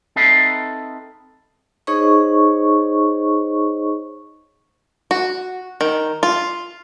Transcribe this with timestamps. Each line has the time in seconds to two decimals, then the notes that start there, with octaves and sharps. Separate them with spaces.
0.16 C4 D#4 A4 B4 E5 F5
1.87 D#4 G#4 C5 C#5 D#5 C#6
5.11 F#4
5.81 D#3
6.23 F4